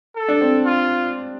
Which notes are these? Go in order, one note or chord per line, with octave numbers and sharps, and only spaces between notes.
A4
D4
C4
F4